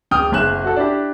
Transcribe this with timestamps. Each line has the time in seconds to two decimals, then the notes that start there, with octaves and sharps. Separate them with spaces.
0.11 D1 G5 D#6 F6
0.32 F#1 B1 G#5 F#6 E7
0.64 F#4 A4
0.76 D4 E4 G4